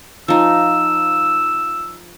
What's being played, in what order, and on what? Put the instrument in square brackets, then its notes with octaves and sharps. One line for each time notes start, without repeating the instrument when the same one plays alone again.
[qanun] F3 D#4 [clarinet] E6